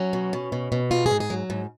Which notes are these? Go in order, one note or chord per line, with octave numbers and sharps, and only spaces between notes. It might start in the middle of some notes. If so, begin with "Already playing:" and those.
Already playing: F#3 C#4
B2
B2
B2
B2
G#2 F4
G#4
G#2
G#4
F#3
G#2